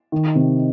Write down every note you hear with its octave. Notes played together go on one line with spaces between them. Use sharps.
D#3
C3